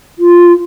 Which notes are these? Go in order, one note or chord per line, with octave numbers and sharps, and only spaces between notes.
F4